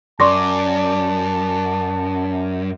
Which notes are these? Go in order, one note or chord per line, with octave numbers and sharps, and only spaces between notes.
F#2 D5 A5 C6 C#6 A#6